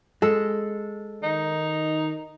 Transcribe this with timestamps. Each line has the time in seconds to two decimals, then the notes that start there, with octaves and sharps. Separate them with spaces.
0.22 G#3 A4
1.23 D#3 D#4